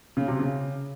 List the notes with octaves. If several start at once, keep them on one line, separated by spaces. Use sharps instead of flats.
C#3
C3
C#3